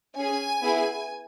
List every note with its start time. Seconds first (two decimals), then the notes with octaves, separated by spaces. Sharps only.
0.16 C#4 G#4 G#5
0.61 B3 E4 G#4